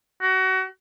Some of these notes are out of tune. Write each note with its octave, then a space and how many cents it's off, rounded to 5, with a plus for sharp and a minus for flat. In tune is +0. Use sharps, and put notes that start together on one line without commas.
F#4 +30